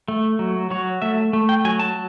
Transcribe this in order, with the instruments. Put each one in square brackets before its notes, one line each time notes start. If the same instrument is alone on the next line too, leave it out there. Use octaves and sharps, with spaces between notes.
[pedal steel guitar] A3
F#3
F#3 C#5
A3 E5
A3
G5
F#3 G#5
A5